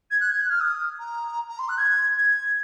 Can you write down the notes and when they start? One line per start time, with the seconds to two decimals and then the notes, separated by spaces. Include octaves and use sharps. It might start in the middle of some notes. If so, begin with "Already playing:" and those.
0.10 G#6
0.20 F#6
0.30 G#6
0.40 F#6
0.49 F6
0.60 D#6
0.99 A#5
1.49 A#5
1.58 C6
1.68 F#6
1.77 G#6
2.17 G#6